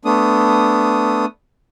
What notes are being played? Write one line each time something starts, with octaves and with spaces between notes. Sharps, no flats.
A3 B3 D4 D#6